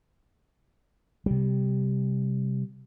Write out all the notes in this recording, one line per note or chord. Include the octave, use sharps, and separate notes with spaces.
C3 G3